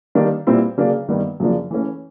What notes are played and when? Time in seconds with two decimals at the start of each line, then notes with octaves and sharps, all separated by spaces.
0.15 D#3 G3 A#3 D4
0.47 A#2 G3 C4 E4
0.78 C#3 F#3 A#3 D4
1.09 G2 D#3 G3 B3
1.40 F#2 C#3 F3 A#3 D4
1.71 E3 A3 C#4